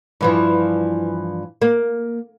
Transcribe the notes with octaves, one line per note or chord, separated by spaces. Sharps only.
G2 E3 F3
A#3